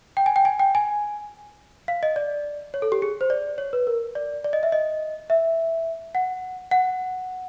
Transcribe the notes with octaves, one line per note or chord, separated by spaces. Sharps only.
G5
G#5
G5
G#5
G5
G#5
F5
D#5
D5
C#5
A4
G4
G#4
C5
D5
C#5
B4
A#4
D5
D5
D#5
E5
D#5
E5
F#5
F#5